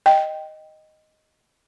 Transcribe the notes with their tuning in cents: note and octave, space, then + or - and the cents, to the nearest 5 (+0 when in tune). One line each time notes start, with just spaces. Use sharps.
D#5 +0 G5 +0